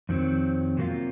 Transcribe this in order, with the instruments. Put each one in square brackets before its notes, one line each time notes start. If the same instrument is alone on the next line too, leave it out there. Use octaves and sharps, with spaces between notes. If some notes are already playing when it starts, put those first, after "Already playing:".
[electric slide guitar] F2 D#3 F#3 C4
C3 F#3 A#3 F4